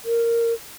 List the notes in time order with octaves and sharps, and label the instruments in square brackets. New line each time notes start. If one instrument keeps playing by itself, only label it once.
[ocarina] A#4